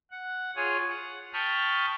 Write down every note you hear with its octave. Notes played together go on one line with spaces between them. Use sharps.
F#5
F4 G#4 C#5 G#5
F#5
G5 A5 B5 C#6 D#6 F6